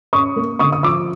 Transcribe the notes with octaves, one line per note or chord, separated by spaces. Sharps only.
C#4 C#6 D#6
A#3
D3 C#6 D#6
D#6
F3 D6 E6